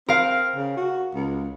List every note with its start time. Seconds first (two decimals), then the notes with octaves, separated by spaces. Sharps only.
0.09 C4 A#4 F5
0.56 C#3
0.77 F#4
1.14 C#2